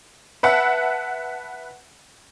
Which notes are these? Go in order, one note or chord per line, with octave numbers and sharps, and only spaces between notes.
B4 E5 F#5 A5